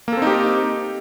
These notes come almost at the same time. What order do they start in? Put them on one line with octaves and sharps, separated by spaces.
A#3 A4 C4 D#4 G4